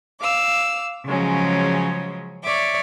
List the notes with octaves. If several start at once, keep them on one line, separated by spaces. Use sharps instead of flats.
F5 D6 E6
C#3 F3 F#3 G#3 C#4
C#5 D5 E5 D6